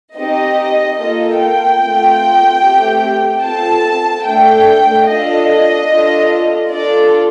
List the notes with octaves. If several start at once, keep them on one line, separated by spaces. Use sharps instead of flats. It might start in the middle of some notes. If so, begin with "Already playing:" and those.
C4 D#4 G4 D#5
A#3 F4 A4 D#5
G5
A3 C4 F4
A3 C4 G4
C4 F4 A4 A5
A3 D4 A4 G5
D4 F4 A4 D#5
D4 F4 A4
D4 F4 A4 D5